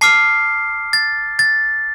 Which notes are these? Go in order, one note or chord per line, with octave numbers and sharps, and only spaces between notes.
A5 D6 F6 C7
A6
A6